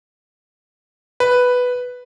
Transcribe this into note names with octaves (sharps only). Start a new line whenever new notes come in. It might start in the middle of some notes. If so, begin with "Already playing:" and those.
B4